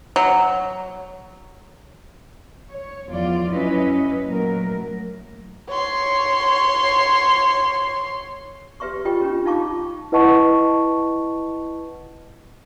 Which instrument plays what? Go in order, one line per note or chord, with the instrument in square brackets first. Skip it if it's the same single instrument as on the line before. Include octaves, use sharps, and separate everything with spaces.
[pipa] F#3
[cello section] C#5
E2 F3 F4 D5
F#2 F#3 C#4 E4 B4 D#5
A#2 F#3 A3 A#4
[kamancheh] C#5 C6
[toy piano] G4 B4 E5 C6 C#6
F4 G4 D#5 G5
C#4 D4
D#4 F4 F5 A5 C#6 D6
[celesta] E4 B4 D#5 F#5 A5 C#6